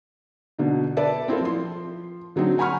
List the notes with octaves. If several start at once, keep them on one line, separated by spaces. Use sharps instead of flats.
B2 D3 D#4
A4 B4 D5 E5 A5
C4 E4 F4 A4
F3 C6
D3 F#3 C4 D#4
F#5 G#5 A#5 B5 C#6 F6